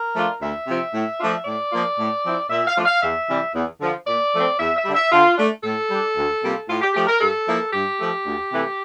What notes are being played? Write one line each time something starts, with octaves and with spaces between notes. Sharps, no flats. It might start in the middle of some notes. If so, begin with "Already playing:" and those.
Already playing: A#4
F3 A3 D4 F4
D2 E5
C3 F3 C4
A2
F3 A3 D4 F4
A2 D5
F3 A#3 F4
A2
F3 C4 E4
A#2 E5
F5
F3 A3 D4 F4
F5
E2 E5
C3 E3 G3
E2
D3 F3
A#2 D5
F3 A3 C4
E2 E5
E5
D3 G3
E5
D3 F4
A3 D4
A2 A4
G3 D4
D2
C3 G3 A#3 F4
A2 F4
G4
F3 A3 G4
A#4
G2 A4
F3 A#3 E4
G2 G4
F3 A3
D2
C3 E3 A3